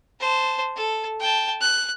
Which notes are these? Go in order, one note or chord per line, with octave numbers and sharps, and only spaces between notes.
C5 A5
A4
G5 A5
F#6